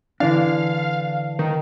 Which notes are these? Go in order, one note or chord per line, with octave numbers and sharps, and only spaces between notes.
D3 E3 D4 F5
D#3